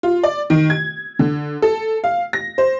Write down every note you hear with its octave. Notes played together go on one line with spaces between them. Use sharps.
F4
D5
D#3
G#6
D3
A4
F5
A#6
C5